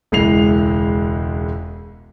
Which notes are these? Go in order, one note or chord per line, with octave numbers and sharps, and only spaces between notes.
E1 C#2 G#3 E4 C7 F7